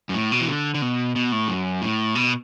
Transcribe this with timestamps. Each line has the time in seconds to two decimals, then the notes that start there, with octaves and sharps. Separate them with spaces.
0.09 F#2
0.14 A2
0.32 B2
0.41 E3
0.48 D3
0.74 D3
0.82 B2
1.16 B2
1.32 A2
1.48 F#2
1.82 A2
2.15 B2